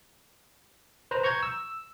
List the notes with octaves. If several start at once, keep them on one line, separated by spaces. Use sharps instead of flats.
B4 C5 A#5
A#5 C#6 G6 G#6
E6